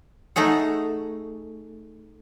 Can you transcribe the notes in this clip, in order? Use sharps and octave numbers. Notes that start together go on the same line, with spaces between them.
A3 D#4 G#4 F#5